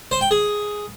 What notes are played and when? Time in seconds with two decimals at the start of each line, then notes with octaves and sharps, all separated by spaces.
0.11 C5
0.21 G5
0.31 G#4